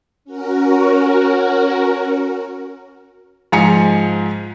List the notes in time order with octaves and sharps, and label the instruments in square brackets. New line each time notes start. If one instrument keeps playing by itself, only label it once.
[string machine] C#4 F#4 A#4
[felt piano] G#2 F3 F5 G#5 A#5 C#7